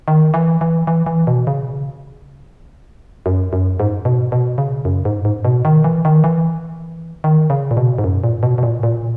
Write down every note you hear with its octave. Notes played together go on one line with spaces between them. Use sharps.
D#3
E3
E3
E3
E3
B2
C#3
F#2
F#2
G#2
B2
B2
C#3
F#2
G#2
G#2
B2
D#3
E3
D#3
E3
D#3
C#3
A#2
B2
G#2
F#2
A#2
B2
B2
A#2
A#2